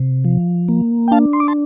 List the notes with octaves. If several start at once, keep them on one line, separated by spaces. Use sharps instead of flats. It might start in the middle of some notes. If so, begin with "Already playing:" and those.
Already playing: C3
F3
A#3
G5
D4 F5 A5
C6
D6
A5 C6